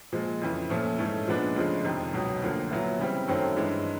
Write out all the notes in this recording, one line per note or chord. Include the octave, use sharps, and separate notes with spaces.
A#2 F3 G#3
F2 C#3 E3
A#2 F3 A3 C#4
G#2 E3 A3 C#4
A#2 F3 G#3 B3 D4
D2 C#3 F3 G#3
F2 C3 D#3
C#2 B2 F#3
D2 D3 F3 A#3
A#2 F#3 B3 E4
C#3 E3 G3 C4
F#2 D#3 F#3 A3 C4
G2 E3 G#3